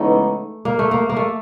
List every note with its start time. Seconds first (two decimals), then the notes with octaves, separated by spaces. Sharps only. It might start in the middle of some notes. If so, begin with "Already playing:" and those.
Already playing: C#3 E3 G#3 A3 B3 D#4
0.65 A#3
0.79 A3
0.91 A#3
1.09 A#3
1.17 A3